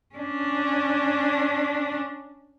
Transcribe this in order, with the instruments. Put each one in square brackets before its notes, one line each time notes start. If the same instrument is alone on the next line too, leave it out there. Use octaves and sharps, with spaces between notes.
[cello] C#4 D4